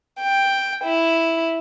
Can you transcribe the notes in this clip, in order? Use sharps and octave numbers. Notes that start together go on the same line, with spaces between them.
G5
E4